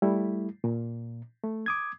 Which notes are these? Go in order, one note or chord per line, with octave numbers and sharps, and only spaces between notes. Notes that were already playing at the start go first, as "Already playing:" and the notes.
G3 A3 E4
A#2
A3
D6 D#6 G#6